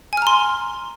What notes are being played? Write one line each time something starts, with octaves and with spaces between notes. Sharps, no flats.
G#5 A#5 C6 F6